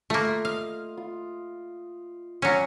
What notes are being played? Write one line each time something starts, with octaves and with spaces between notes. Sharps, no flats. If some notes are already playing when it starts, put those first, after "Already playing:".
A3 A#3 F4 E5
D#5 F5
F4
F#3 C#4 C#5 D5 F5